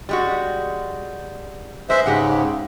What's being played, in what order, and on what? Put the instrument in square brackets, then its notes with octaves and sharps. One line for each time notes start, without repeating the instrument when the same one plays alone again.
[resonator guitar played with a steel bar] G3 G#3 F#4
[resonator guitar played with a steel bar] G#3 B4 [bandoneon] C5 E5
[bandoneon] G#2 C#3 [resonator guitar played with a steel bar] G#3 G4 F#5